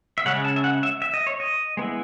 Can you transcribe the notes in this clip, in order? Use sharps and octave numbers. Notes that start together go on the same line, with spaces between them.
E5
C#3 G#3 C#4 F#5
A5
E5
F#5
E5
E5
D#5
C#5
D#5
G#3 B3 E4